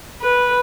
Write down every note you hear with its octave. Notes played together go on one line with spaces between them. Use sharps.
B4